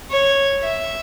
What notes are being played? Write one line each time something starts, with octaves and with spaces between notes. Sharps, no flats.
C#5
E5